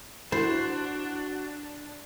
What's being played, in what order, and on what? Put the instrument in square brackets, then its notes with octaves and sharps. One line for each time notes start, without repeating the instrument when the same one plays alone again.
[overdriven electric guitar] D4 [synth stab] E4 [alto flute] F#4 [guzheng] C5